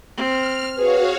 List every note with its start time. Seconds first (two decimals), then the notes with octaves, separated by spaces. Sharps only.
0.17 C4 F6
0.77 F#4 G#4 B4 C#5 F5